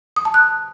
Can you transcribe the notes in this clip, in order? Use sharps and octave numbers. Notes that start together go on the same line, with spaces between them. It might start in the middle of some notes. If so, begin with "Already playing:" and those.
D#6
A5
F#6